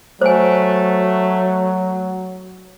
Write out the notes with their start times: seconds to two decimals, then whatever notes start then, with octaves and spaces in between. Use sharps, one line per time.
0.21 F#3 A3 C5 G#5